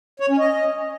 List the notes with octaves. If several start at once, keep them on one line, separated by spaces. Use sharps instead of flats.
C#5
C#4
D#5